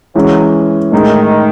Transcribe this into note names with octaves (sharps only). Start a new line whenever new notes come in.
E3 F#3 G#3 C#4
A2 D#3 G#3 D#4